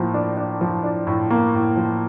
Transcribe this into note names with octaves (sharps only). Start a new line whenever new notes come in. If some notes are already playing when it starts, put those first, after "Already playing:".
Already playing: A2 F3 A#3
D4
D4
F3
D4
A2
A#3
A2
F3